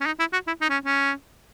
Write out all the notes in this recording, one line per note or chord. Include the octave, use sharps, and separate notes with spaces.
C#4
D#4
E4
F#4
E4
D#4
C#4
C#4